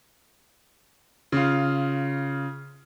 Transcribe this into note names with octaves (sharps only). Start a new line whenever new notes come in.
C#3 F4